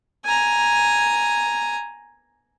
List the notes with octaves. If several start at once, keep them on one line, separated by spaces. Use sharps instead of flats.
G#5 A#5